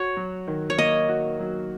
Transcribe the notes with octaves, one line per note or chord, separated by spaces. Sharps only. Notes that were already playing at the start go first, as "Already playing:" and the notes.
Already playing: F#4 C#5
F#3
D#3
C#5
A#3 D#5
F#4
F#3